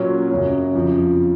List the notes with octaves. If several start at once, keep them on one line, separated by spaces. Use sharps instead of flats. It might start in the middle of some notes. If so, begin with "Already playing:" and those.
Already playing: A#2 F#3 C#4
F#2 C#3 F#3
F2 C#3 F3